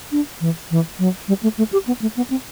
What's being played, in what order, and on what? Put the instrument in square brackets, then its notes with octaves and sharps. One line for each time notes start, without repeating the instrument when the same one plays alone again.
[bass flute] D4
E3
E3
F#3
G3
A3
A3
G4
B3
A3
B3
C4